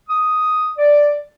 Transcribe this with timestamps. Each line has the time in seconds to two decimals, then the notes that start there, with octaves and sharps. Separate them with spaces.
0.08 D#6
0.78 D5